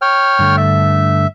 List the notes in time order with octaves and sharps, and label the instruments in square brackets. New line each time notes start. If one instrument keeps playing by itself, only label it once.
[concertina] C#5 G5 F6
[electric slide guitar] G2 D3 A3
[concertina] E5